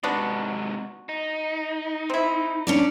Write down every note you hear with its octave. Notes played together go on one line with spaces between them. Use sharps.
G#2 C3 B3 D4 F#4
D#4
C4 E4
C#4 D4 D5